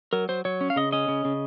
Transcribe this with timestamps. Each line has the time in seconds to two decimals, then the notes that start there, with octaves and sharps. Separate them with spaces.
0.13 F#3 A#4
0.29 F#3 C5
0.45 F#3 C#5
0.61 C#4
0.70 F5
0.76 C#3 D#5
0.92 C#4 D#5
1.08 C#3
1.25 C#3